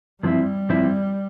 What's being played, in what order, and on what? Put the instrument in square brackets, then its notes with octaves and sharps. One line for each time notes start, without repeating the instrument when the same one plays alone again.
[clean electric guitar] G2 F3 C4 E4 [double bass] G3
[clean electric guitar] G2 F3 C4 E4